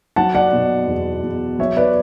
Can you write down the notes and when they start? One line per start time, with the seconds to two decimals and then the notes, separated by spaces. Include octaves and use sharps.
0.16 F#3 F#5 A5
0.35 D5 F#5
0.53 B2
0.88 E2
1.23 E2
1.59 F#3 C#5 E5
1.77 B4 D5